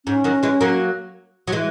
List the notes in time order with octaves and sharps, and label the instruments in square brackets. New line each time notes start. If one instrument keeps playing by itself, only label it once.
[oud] G#2 [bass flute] C#4
[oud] D#3 F#3
E3 G#3
F#3 A#3
F#3
E3 G#3